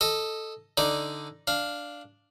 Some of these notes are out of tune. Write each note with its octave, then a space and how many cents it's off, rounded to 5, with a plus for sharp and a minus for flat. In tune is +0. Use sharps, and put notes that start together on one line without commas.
A4 +0 D#5 +0
D3 +0 D#4 +0 D5 +0
D4 +0 F5 +0